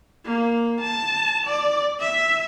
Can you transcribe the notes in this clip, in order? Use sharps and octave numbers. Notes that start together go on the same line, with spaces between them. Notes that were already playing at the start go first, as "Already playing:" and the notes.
A#3
A5
D5
E5